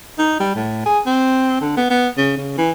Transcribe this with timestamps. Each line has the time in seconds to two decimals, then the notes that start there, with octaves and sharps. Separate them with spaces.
0.19 D#4
0.40 G3
0.55 A2
0.86 G#4
1.06 C4
1.61 D3
1.77 B3
1.90 B3
2.17 C#3
2.38 C#3
2.58 E3